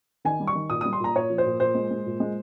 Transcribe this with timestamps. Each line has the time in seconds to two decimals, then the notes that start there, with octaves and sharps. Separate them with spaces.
0.25 D#3 G#5
0.40 G3
0.47 C#6
0.55 D#3
0.70 A#2 D#6
0.81 G3 D#6
0.93 C6
1.00 A#2 A#5
1.15 A#2 C#5
1.30 F3
1.38 C5
1.46 A#2
1.60 A#2 C5
1.75 G#3
1.90 G#3
2.06 A#2
2.20 G#3